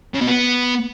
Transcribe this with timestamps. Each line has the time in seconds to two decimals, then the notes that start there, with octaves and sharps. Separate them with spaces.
0.14 C#3
0.21 B2
0.28 B3